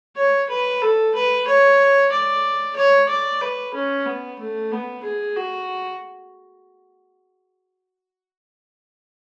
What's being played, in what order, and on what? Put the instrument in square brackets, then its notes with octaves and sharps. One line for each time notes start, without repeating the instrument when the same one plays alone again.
[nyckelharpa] C#5
B4
A4
B4
C#5
D5
C#5
D5
B4
C#4
B3
A3
B3
G#4
F#4